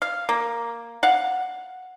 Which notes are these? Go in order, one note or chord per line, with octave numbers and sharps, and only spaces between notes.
F5
A#3
F5 F#5